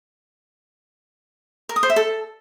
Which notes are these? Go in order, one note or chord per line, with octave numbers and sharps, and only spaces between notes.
A#4
D#6
C5
E5
A4